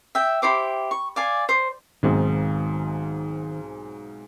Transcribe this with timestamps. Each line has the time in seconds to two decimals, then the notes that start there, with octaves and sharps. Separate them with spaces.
0.15 E5 G5
0.42 E4 G4 C5 D6
0.91 C#6
1.16 D5 F5 G#5
1.49 C5
2.03 B1 G#2 D#3 C4